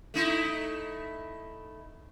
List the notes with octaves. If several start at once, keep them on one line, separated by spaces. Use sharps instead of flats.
A3 D#4 E4